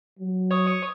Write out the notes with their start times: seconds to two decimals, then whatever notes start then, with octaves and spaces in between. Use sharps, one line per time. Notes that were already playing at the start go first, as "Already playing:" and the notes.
0.19 F#3
0.51 C#5 C#6 D#6